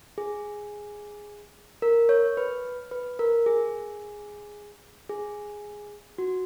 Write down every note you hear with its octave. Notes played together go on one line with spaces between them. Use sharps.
G#4
A#4
C#5
B4
B4
A#4
G#4
G#4
F#4